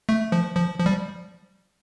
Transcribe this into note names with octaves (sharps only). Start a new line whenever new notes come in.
A3
F3
F3
F3
G3